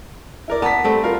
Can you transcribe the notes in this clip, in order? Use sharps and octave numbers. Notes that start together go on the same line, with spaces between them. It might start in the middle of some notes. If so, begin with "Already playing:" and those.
E4 A#4 D5
B3 A5 A#5 B6
G3 A3 C4
F4 A#4 F5